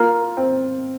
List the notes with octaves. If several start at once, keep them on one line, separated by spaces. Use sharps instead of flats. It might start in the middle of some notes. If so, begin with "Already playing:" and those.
Already playing: A#3 F4
C4